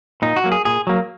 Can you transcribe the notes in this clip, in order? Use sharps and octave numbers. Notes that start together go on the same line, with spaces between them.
A#2 D#4
F#4
F#3 A#3
G#4
A#2 G#4
F#3 A#3